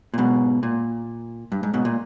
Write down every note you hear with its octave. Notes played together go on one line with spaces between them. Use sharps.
A#2
G#2 B2
A#2
G2
G#2
G#2 B2
A#2